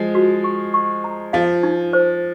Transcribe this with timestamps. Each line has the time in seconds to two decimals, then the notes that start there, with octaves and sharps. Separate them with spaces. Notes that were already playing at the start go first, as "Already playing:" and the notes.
Already playing: F3 G#3
0.15 F#4
0.44 C#6
0.74 C#6
1.04 A#5
1.33 F3 F5
1.63 D#4
1.93 C5